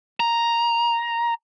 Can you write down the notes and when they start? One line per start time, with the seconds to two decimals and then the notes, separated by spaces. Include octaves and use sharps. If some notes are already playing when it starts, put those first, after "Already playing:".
0.20 A#5